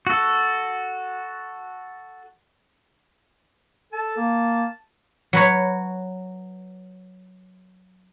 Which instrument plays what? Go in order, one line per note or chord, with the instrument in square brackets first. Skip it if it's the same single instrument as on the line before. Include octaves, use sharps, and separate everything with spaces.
[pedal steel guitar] F#4 A4
[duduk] A4 [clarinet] A5
[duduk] A#3
[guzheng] F#3 B4 C#5